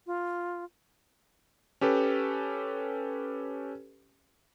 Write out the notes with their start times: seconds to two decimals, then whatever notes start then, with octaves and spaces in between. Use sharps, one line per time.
0.06 F4
1.81 C#4 G4 A4 B4